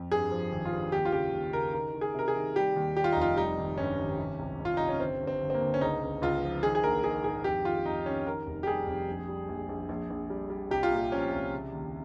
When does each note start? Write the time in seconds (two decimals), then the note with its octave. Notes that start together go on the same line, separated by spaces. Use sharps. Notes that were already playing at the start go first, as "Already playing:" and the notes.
Already playing: F2
0.11 G2 G#4
0.31 F3
0.52 G#1
0.65 F4
0.72 G2
0.92 D#2 G4
1.05 F4
1.12 C#3 G4
1.34 D#2
1.53 C#3 A#4
1.74 D#3 A#4
1.94 D#3
2.01 G#4
2.14 C3 A#4
2.28 G#4
2.35 D#3
2.56 G3 G4
2.76 D#2
2.96 G3 G4
3.04 F4
3.12 D#4
3.17 F1 F4
3.37 G3 D#4
3.58 G#1
3.78 G2 C#4
3.99 G#1
4.19 C3
4.39 C2
4.60 C2
4.65 F4
4.77 C3 D#4
4.89 C#4
5.00 G1 C4
5.21 G1
5.27 C4
5.40 G1
5.50 C4
5.54 A#3
5.62 G1
5.74 C#4
5.81 C#2 D#4
6.02 C#2
6.22 C#2 F4
6.43 F3
6.63 D#3 G#4
6.75 G#4
6.83 A#1 A#4
7.04 D#3 G#4
7.24 G#2 G#4
7.44 F2 G4
7.64 D#3 F4
7.85 F2 D#4
8.06 D#3 C#4
8.26 D#3 A#4
8.47 F1
8.63 G4
8.67 G3 G#4
8.87 F2
9.08 A#1
9.28 G3
9.48 A#1
9.69 A#1
9.89 A#1
10.10 A#1
10.30 G3
10.50 G3
10.71 C2 G4
10.83 F4
10.91 A#2 G4
11.12 F3 C#4
11.33 C2
11.53 C#3
11.73 D#2